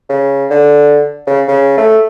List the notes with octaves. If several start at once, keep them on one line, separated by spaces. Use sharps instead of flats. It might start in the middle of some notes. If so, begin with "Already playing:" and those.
C#3
D3
C#3
C#3
A3